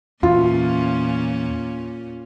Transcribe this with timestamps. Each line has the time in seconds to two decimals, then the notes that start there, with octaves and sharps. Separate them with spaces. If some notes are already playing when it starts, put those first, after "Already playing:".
0.23 E2 A#2 C#4 F4